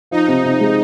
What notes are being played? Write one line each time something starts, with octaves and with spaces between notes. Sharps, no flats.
F3 D#4
C3
C3
G#3